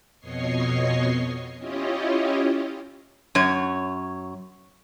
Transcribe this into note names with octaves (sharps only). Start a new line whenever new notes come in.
F2 B2 C#5 D#5 C#6 C7
C#4 E4 F4 G4 C#5 D#5
F#2 C#5